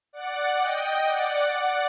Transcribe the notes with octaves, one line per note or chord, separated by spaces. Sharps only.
D5 F#5
D#5 G5
D5 F#5
D5 F#5